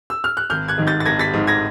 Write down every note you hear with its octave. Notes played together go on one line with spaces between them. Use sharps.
E6
F6
F#6
G#1 F6 G6
F#6 G#6
G#2 D#3
G6 A6
A6
G#1 G#6 A#6
A6 B6
G#2 D#3
G#6 A#6